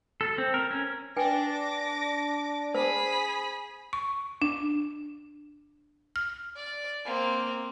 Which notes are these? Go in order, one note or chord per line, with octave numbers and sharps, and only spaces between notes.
A4
C4
A#4
C#4
D4 B4 G5 G#5 D6 A#6
G#4 C5 B5
C#6
D4
F6
D5
A#3 C4